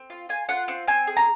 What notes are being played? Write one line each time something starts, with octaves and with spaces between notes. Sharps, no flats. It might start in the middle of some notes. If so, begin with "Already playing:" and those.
Already playing: C4
F4
F4 G#5
F4 F#5
C4 F#5
C4 G#5
G#4
A#5